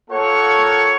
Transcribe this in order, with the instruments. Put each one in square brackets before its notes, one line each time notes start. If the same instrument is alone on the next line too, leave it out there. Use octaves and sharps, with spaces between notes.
[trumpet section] A#3 F4 A4 C#5 F#5 C#6